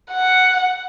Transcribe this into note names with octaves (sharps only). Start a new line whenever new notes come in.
F#5